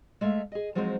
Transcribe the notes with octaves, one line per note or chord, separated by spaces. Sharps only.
G#3 A3 E5 F5
G#4 D#5
F3 F#3 G#3 C4 D#4 C5